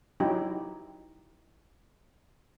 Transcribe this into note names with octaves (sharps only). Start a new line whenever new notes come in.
F#3 D#4 E4 G4